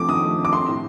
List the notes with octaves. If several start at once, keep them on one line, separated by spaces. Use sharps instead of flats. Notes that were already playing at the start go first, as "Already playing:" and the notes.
Already playing: F2 A3 C4 D6
D#3 D#6
A3
C4
D6
C4 C6
A2